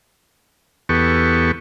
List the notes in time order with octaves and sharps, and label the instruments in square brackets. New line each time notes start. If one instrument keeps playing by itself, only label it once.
[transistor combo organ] E2 B3 G4 A4 C#6